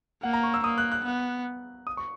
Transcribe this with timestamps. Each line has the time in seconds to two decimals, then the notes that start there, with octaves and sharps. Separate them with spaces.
0.23 A#3 F#5
0.33 A#5
0.43 C#6
0.54 E6
0.64 A#3 D#6
0.78 F#6
0.92 F#6
1.04 B3
1.87 D#6
1.97 C#6